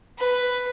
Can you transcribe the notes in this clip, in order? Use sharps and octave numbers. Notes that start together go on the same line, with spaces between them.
B4